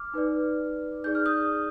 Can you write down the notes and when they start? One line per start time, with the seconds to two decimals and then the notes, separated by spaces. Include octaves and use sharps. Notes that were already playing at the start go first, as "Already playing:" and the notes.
Already playing: D6 F6
0.14 D#4 B4 D5
1.04 D#4 G#4 D5 G6
1.15 F6
1.26 D#6 G6